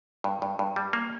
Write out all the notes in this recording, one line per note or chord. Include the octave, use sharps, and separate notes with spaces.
G2
G2
G2
G3
A#3